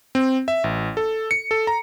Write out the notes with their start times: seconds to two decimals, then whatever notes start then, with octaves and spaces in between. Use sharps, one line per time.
0.15 C4
0.48 E5
0.64 A1
0.97 A4
1.31 C#7
1.51 A4
1.67 A#5